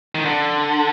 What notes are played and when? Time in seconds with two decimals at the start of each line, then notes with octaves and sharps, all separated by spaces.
0.15 D#3
0.25 D3